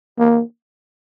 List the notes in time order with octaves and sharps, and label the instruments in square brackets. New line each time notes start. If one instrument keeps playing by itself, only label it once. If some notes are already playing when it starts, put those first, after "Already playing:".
[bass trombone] A#3